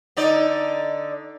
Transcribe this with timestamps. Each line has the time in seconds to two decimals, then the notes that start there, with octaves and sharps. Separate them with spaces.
0.17 D3 D#4 D5